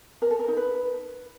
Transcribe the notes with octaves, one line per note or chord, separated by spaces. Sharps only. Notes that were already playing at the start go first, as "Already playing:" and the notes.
A#4
A4
A#4
D#4
B4